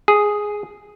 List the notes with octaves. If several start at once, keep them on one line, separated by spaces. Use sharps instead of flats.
G#4